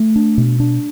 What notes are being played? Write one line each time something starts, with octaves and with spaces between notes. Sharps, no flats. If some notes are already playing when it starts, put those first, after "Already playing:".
Already playing: A3
D4
B2
D4